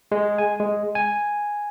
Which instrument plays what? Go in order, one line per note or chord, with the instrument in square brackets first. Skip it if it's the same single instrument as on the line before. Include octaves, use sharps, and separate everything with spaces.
[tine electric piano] G#3
G#5
G#3
G#5